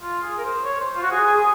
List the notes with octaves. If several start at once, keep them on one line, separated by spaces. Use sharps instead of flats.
F4
G#4
A#4
C5
C#5
C5
F4
F#4
G#4
G#4
G#4